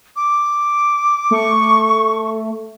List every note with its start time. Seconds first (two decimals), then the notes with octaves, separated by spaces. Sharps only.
0.16 D6
1.31 A3 C#6